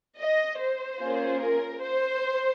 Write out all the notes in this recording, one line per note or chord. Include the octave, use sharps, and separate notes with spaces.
D#5
C5
A#3 C#4 F4 G#4
A#4
C5